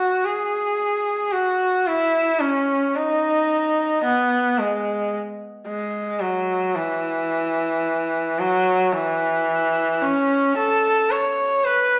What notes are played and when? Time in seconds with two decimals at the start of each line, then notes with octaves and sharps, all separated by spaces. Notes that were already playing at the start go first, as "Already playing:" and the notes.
Already playing: F#4
0.24 G#4
1.32 F#4
1.87 E4
2.41 C#4
2.95 D#4
4.04 B3
4.58 G#3
5.68 G#3
6.21 F#3
6.75 E3
8.39 F#3
8.93 E3
10.02 C#4
10.57 A4
11.10 C#5
11.64 B4